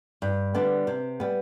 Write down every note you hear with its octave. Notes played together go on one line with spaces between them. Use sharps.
G2
D3 G3 B3 D4
C3
G3 B3